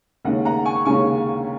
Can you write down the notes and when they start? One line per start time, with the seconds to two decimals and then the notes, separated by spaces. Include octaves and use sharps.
0.25 D#2 C#3 G#3 C#4 F#5
0.45 F#5 A#5
0.65 G#5 C#6
0.85 D#2 C#3 G#3 C#4 G#5 C#6